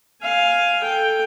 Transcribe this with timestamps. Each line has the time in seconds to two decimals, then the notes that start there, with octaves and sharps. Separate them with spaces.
0.22 F5 G#5
0.82 A4 G5